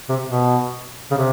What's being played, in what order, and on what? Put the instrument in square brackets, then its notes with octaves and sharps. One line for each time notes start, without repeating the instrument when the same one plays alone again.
[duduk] C3
B2
C#3
C3